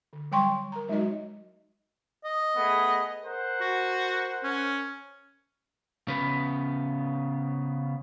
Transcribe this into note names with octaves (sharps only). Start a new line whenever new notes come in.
D3
F#3 G3 G5 C6 C#6
A#4 A#5
F#3 G#3 D#4 F#4 D#5
D#5
A3 B3 G#4
A#4 C5 F#5
F#4
C#4
C#3 B3